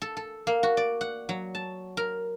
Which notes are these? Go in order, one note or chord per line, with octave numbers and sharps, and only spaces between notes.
A4
A4
A#3
F#4
D5
F#5
F#3
A5
A#4